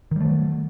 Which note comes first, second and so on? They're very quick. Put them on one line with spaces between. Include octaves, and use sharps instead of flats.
D#3 G3 A3 F#3